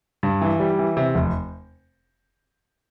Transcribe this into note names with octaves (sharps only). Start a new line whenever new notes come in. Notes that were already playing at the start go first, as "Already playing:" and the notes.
G2
E3
G3
E3
C3
F1